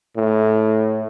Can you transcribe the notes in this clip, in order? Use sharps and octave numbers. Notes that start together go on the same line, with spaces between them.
A2